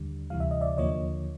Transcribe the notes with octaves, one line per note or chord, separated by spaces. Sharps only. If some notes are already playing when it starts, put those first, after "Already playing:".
Already playing: D#2 D3 G3
D2 C3 E3 G3 F5
E5
D#5
D5 E5
D#2 D3 F3 A#3 C#5 D#5